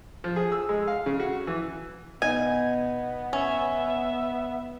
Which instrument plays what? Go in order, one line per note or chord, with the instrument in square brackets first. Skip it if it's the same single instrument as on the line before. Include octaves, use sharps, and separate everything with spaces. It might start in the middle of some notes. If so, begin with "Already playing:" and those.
[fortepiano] F3
G#4
E6
G#3
F5
C#3
F#4
E3
[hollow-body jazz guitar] B2 D#4 [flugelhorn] B3 [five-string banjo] G#5
[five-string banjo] C#4 [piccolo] E5